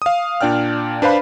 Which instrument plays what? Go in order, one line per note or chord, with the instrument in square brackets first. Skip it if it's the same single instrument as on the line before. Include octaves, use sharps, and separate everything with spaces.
[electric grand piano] F5 D#6
A#2 D4 D5 G5 F6
D4 B4 C5 F5 B5